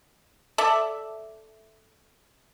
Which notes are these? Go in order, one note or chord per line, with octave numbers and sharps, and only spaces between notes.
A4 D5 E5